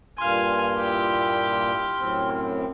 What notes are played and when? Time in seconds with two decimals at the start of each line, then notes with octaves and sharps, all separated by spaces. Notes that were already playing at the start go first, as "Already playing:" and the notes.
0.18 G2 A#2 F5 G#5 C6 F6
0.77 E4 G4
1.97 F#2 A2 C4